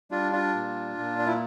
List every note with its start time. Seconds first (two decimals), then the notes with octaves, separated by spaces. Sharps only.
0.11 G3 D4 F4
0.32 D4 F4
0.54 A#2
0.98 A#2
1.19 D4
1.26 E4